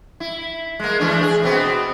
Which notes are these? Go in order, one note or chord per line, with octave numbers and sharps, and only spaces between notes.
E4
G#3 A#3
E3 A3 D4
G#4
B2 B3 C4